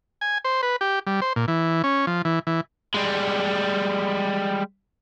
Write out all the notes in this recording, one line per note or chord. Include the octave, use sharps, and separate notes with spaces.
G#5
C5
B4
G4
G3
C5
A#2
E3
C#4
F3
E3
E3
G3 G#3